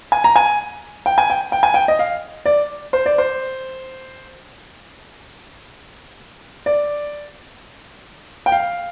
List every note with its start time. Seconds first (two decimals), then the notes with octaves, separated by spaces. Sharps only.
0.12 G#5
0.24 A#5
0.36 G#5
1.06 G5
1.18 G#5
1.30 G5
1.52 G5
1.63 G#5
1.74 G5
1.88 D#5
1.99 F5
2.46 D5
2.93 C5
3.06 D5
3.18 C5
6.66 D5
8.46 G5
8.52 F5